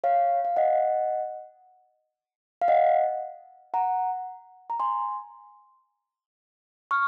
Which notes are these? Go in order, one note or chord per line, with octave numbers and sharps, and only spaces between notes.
C#5 F5
F5
D#5 F#5
F5
D#5 F#5
F#5 A#5
A#5
G#5 C6
C#6 F6